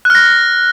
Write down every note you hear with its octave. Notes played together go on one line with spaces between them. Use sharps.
F6 F#6 A#6